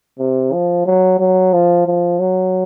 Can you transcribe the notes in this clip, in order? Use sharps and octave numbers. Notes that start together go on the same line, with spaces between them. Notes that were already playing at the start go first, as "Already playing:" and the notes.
C3
F3
F#3
F#3
F3
F3
F#3